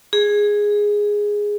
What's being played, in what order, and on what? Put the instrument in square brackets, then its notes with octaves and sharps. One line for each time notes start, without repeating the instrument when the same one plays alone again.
[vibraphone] G#4